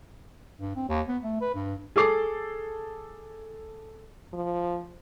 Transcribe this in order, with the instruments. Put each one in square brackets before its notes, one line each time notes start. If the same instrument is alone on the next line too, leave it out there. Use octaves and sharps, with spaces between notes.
[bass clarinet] G2
C4
D#2
B3
A3
B4
G2
[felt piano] G#4 A4 D6 C7
[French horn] F3